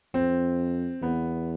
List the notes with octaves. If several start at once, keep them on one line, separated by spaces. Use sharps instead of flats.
F2 C4
E2 B3